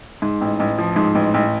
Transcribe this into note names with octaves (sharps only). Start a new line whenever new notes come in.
G#2
A1
A1
F3
G#2
A1
A1